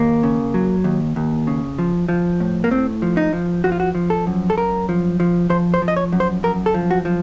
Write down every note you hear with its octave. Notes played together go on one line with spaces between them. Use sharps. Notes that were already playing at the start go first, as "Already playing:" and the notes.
Already playing: D#2 A#3
C#3
F#3
D#2
D#2
C#3
F3
F3
A2
A#3
A2 C4
F3
D#4
F3
F3 F#4
F4
F#4
F3
A4
F#2
A4
F#2 A#4
F3
F3
F3 C5
C5
F3
D#5
C#5
F#2
C5
F#2 A#4
A4
F3
F#4
F3